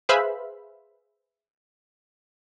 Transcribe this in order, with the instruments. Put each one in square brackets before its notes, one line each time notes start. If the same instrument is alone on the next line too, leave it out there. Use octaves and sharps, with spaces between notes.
[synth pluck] G#4 B4 C5 E5 F5 B5